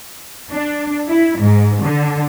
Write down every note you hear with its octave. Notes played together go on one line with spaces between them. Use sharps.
D4
E4
G#2
D3